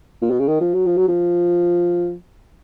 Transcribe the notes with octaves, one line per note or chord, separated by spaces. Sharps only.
A#2
B2
C#3
D#3
F3
F#3
F3
F#3
F3